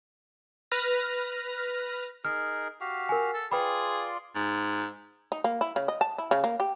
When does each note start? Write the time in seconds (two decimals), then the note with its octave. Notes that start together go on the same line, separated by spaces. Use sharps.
0.72 B4 F6 A#6
2.25 D#4 G#4 A#4 F6
2.81 F#4 G4 F5
3.09 A#4 G#5
3.34 A4
3.52 F4 G#4 B4 D5 G5 B5 C6
4.36 G#2
5.32 D#4
5.44 A#3
5.61 E4
5.76 C#3
5.88 D#5
6.01 A5
6.18 E4
6.31 C#3
6.44 A#3
6.60 G4